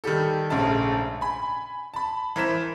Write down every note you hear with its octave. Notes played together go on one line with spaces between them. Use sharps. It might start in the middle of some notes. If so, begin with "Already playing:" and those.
D#3 G3 G4 A4
A#1 G#2 C#3 A3 A5
G#5 B5
A5 B5
E3 A#4 C5 B6 E7